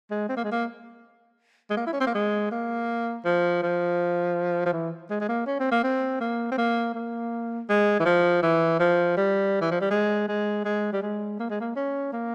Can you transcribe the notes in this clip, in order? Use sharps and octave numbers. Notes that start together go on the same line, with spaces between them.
G#3
C4
A#3
G#3
A#3
G#3
A#3
E4
C#4
C4
A#3
G#3
A#3
F3
F3
F3
E3
G#3
G#3
A#3
C#4
C4
A#3
C4
A#3
C4
A#3
A#3
G#3
E3
F3
E3
F3
G3
E3
F3
G3
G#3
G#3
G#3
G3
G#3
A#3
G#3
A#3
C#4
A#3